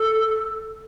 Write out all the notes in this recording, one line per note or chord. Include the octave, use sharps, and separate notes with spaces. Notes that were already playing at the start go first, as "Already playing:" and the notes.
Already playing: A4